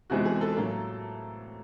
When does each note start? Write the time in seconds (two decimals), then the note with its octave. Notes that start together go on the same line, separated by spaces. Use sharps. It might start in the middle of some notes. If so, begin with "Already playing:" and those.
0.10 F2 C3 E3 G#3 B3 F#4
0.25 G#4
0.41 A4
0.56 A2 F#3 A#3